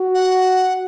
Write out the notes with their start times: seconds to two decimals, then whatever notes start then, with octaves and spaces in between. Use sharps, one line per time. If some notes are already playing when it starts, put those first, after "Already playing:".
Already playing: F#4
0.15 F#5